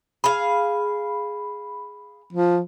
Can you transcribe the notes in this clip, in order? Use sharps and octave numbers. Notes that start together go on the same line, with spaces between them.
G#4 F5 B5
F3